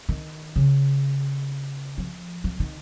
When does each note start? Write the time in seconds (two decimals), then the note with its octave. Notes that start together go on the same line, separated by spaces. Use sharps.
0.09 D#3
0.56 C#3
1.98 F3
2.44 F3
2.60 D#3